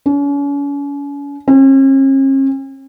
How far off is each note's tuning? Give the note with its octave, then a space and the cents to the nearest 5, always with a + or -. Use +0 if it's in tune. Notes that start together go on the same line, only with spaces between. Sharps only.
C#4 +40
C#4 -45